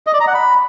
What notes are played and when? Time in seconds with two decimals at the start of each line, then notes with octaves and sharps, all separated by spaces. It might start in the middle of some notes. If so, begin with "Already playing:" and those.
0.07 D#5
0.14 D5
0.20 A#5
0.27 F#5
0.34 B5